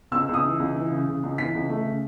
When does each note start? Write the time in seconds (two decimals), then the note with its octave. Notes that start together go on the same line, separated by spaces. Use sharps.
0.12 C#2 E6
0.28 C#2
0.34 D#6
0.43 E3
0.59 C#2
0.75 E3
0.91 C#3
1.07 C#3
1.23 C#2
1.38 E3 B6
1.54 C#2
1.69 A3
1.85 C#3